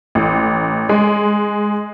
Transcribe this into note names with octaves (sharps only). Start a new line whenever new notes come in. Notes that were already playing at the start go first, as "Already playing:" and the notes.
A1
G#3